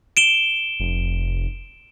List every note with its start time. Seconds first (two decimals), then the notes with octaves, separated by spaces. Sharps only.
0.17 D7 E7 G7
0.80 F1